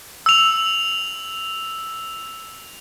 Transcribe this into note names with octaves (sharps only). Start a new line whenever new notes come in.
E6 F7